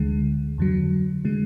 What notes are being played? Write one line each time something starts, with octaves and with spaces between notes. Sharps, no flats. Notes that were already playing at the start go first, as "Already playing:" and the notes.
Already playing: D2 D3 G#3
F2 D3 F#3
D3 G#3